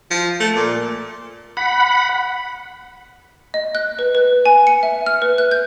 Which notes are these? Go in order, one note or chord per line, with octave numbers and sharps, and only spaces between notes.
F3
A3
A#2
F#5 B5
D#5
F#6
B4
B4
G#5
C#7
E5
F6
B4
F#6
G6